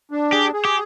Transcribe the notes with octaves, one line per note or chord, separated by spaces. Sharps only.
D4
G4 G#4
G#4
G4